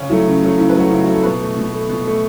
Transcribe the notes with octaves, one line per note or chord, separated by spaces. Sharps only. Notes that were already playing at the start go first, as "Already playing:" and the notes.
Already playing: C#3 C#4
F#3 A3 E4
C#3
F#3 A3
C#3 E4
B4
F#3 A3 F#4
C#3 E4
F#4
F#3 A3
A4
B2 B4
A3
B2
A3
B2
A3